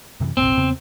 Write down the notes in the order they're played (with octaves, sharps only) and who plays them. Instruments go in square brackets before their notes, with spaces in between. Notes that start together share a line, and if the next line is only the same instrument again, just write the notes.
[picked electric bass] F#2 C3 E3
[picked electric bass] F#1 B1 [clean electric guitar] C4
[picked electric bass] E2 C#3 B3